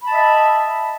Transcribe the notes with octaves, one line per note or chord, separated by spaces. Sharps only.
D#5 E5 A5 B5